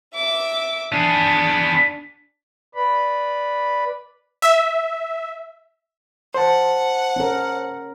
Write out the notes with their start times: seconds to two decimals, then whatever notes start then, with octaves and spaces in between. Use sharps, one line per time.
0.15 E5 D6
0.92 B3 D4 G#4
2.74 B4 D5 B5
4.42 E5
6.34 C5 F#5 A5
7.16 C#4 A#4